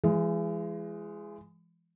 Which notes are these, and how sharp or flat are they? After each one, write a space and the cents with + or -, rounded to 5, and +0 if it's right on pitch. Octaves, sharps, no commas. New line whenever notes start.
E3 +40 G#3 +0